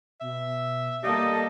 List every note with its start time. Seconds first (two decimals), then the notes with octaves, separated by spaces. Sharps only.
0.21 B2 E5
1.04 G3 A#3 A4 D#5 F5